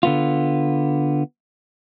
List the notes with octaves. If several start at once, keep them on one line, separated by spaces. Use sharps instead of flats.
D3 B3 F4